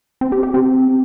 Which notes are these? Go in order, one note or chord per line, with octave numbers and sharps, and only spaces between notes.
C4
G4
G4
C4